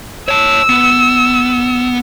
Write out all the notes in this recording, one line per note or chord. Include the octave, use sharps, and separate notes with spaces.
C#5 A5 E6
B3